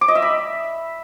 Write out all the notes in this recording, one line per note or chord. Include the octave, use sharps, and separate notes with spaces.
D6
D#5
E5
B5